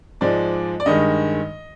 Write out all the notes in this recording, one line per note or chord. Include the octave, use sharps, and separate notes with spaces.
G#2 F3 G#3 D5
D5
G2 D#3 G#3 D#5